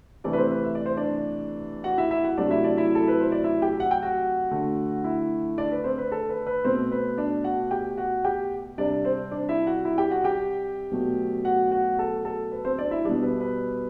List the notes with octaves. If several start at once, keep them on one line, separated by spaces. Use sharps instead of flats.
C3 E3 A3 D4 D5
B4
C4 C5
B4
E5
D5
C5
D4 D5
F#4 F#5
E4 E5
E4 E5
F#4 F#5
C3 F#3 A3 D4 D5
E4 E5
D4 D5
E4 E5
A4
B4
C5
D5
E4 E5
G4 G5
F#5
G5
F#4 F#5
D3 A3
E4 E5
D4 D5
B4
C4 C5
B4
A4
B4
B4
B2 A3 C4 C5
B4
D4 D5
F#4 F#5
G4 G5
F#4 F#5
G4 G5
C3 G3 D4 D5
C4 C5
D4 D5
E4 E5
F#4 F#5
E4 E5
G4 G5
F#4 F#5
G4 G5
B2 F#3 A3
F#4 F#5
F#4 F#5
A4
A4
B4
C4 C5
D4 D5
E4 E5
B2 G3 D4 D5
B4
B4